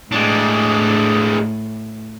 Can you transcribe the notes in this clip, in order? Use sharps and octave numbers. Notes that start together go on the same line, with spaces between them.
A2 G#3 D4